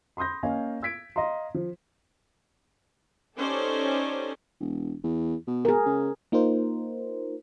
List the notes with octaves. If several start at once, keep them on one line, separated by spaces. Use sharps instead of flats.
B5 C6 D#6 G6 A#6
A#3 C#4 D#5 F5 G#5
E6 G#6 B6 D7
D#5 F5 A#5 C6
F3
C#4 D#4 G4 A4 C5 D5
E1
E2
B2
G#4 A#4
C#3
A#3 D#4 F4 A#4 C5